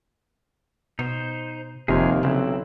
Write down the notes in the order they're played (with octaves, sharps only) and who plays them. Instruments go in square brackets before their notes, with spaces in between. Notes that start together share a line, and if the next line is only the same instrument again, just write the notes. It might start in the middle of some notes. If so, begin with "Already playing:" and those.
[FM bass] B2 [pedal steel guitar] D#4 C5
[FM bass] F1 [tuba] D#2 [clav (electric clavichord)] C3 F3 C5 [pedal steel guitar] G#4 A#4 G#5
[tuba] B1 [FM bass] C#3 [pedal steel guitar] E3 C4 E4